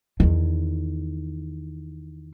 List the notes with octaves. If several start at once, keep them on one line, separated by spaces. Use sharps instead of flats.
E2 D#3